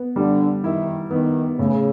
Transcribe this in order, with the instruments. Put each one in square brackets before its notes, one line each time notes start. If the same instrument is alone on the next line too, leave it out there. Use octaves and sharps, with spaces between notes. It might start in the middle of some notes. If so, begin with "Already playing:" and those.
Already playing: [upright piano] B3
[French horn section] D3 [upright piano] G3
[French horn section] D#3 [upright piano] E4
[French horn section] D#3 [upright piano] B3
[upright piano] A2 [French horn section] C#3